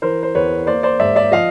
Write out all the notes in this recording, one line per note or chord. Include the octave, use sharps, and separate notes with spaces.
E3 A#4 C5
C5
E2 B4 C#5
A#3 C5 D5
C5 D5
G#2 D5 E5
D5 E5
F3 D#5 F5